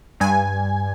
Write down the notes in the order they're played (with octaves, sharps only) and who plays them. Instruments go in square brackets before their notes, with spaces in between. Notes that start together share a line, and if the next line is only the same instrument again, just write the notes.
[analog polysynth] G2 G#5